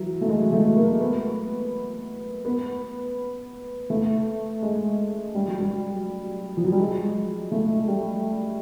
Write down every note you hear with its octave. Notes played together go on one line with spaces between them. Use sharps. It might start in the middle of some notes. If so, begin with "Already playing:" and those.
Already playing: E3 F#3
A3
G#3
A3
A#3
B3
B3
A3
G#3
G3
F#3
G3
F3
F#3
G3
G#3
A3
G3